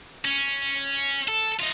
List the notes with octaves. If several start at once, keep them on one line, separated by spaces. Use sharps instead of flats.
C#4
A4
D#4 F4